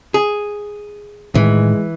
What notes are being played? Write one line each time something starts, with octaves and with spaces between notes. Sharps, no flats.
G#4
A2 D#3 E3 G#3